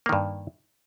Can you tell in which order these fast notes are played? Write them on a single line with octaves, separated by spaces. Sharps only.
A#3 D#3 G2